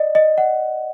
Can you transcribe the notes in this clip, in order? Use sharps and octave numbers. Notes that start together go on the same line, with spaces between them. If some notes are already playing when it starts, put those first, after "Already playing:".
Already playing: D5 D#5
D#5
F#5